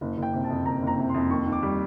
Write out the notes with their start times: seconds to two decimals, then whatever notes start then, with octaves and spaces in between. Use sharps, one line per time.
0.01 F#1
0.17 F#1
0.22 G5
0.34 C3
0.44 A5
0.50 F2
0.65 F#1 A#5
0.82 F#1
0.87 A#5
0.98 C3
1.09 C6
1.14 F2
1.30 D#2 C#6
1.46 D#2
1.52 D6
1.62 G3